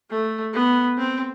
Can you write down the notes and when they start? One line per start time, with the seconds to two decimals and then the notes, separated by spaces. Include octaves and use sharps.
0.10 A3
0.53 B3
0.98 C4